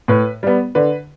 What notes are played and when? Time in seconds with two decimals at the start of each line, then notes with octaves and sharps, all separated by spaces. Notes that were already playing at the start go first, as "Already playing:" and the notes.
0.08 A2 B4
0.43 G3 B3
0.75 D3 B4